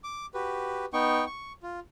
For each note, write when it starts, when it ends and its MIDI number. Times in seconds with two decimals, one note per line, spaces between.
0.04 0.26 86
0.34 0.85 66
0.34 0.85 67
0.34 0.85 71
0.93 1.25 59
0.93 1.25 63
0.93 1.25 79
0.93 1.25 85
1.26 1.53 85
1.63 1.80 65